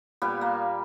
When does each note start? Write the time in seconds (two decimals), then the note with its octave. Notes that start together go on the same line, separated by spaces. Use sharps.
0.22 A#2 G3 B3
0.41 A#3